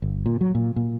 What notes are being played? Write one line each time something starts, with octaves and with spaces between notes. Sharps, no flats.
G1
A#2
F#3
A#2
A#2